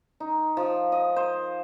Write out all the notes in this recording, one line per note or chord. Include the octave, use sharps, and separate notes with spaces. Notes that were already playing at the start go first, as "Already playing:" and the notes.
D#4
F3
D#5
C5